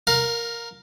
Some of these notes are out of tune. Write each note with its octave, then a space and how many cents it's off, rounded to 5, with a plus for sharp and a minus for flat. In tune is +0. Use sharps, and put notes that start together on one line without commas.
A#4 +0 F5 +25